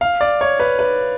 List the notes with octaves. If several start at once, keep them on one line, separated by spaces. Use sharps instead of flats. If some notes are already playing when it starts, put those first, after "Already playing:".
F5
D5
C#5
B4
B4